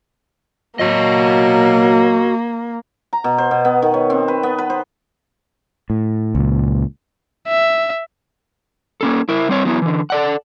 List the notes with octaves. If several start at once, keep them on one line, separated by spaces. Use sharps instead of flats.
F#3 A#3 F#4 D#5
A#5
B2
C5
B2
B3
D#3
C#5
C4
B4
B3
B4
C5
A2
C#2 A#2
E5
A#3 C#4 A4
E4 A#4 E5
G3 C4 C#5
F#3 B3 D#4 E4
D3 E3
A4 D5 F#5